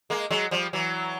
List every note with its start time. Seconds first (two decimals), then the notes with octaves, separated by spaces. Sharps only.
0.10 G#3 A#3
0.31 F#3 G#3
0.51 F3 G3
0.73 E3 F#3